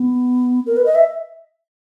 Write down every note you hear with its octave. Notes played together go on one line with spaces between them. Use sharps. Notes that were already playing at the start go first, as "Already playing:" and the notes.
Already playing: B3
A#4
B4
D#5
E5